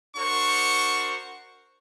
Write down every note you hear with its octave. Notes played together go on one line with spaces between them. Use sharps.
D4 F#4 A#4 C5 C#6